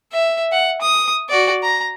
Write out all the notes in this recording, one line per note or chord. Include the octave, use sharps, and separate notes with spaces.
E5
F#5
D#6
F#4 D5
A#5